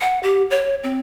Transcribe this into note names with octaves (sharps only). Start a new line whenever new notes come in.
F#5
G4
C#5
C4